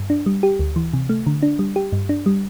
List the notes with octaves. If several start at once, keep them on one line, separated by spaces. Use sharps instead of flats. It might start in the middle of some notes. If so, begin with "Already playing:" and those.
Already playing: G2
D4
G3
G4
D2
E3
C3
A3
D3
D4
G3
G4
G2
D4
G3